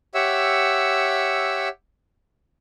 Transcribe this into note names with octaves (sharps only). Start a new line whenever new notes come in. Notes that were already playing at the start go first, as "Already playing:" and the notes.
G4 C#5 E5 F#5 E6